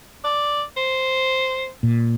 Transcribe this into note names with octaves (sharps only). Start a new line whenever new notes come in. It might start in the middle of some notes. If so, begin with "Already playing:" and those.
D5
C5
A#2